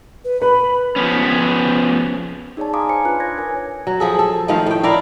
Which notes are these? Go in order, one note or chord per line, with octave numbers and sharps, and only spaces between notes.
B4
B4 B5
F3 B3 C#4
D#4 G#4 C#5 D5 A5
F5 G#5 A#5 C6 D6 D#6
C5 F5 G#5 C#7
D4 F4 B4 F#6
C#5 G#6 A#6
A#4 G#5
F#3
F3 G#4 A4
A4
D#3 F3 A3 F5
A2 G5
E4 A#4 D5 F5